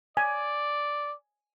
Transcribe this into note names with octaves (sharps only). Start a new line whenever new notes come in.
D5 G#5